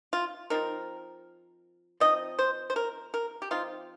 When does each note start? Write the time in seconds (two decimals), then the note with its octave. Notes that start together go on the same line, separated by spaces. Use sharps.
0.13 F4
0.50 F3 C4 D#4 A#4
2.00 F3 C4 D#4 D#5
2.39 C5
2.70 C5
2.76 A#4
3.14 A#4
3.42 G4
3.51 F3 C4 D#4 F4